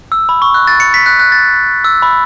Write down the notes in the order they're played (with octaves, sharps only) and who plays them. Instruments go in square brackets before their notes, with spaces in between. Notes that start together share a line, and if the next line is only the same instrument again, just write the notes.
[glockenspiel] E6
B5
C#6
F#6
A6
C#7
B6
F#6
F#6
A6
E6
B5